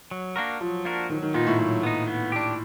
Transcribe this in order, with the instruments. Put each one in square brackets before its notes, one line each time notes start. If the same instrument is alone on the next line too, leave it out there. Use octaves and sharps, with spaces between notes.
[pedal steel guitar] F#3
A#3 D4 F#4 A#4
[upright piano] F3 [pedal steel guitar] F#3
[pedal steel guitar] A#3 D4 F#4 A#4
[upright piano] D#3 [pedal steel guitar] F#3
[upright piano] D#3
[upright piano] A#2 [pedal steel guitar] B3 D#4
[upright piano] A2
[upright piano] A2 [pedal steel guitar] F#3
[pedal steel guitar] B3 D#4
B3
D4 G4